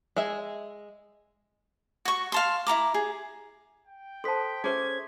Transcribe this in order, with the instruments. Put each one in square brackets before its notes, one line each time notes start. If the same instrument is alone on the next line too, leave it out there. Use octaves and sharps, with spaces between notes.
[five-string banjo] G#3 E5 G#5
[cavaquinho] F#4 C#6
F5 A5 C6
E4 F#4 A#5 D6
G#4
[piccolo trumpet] G5
[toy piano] A4 C5 A5 [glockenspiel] C6 D#6 B6
[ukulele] C#4 C5 E5 [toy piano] G#4 [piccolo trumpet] G#6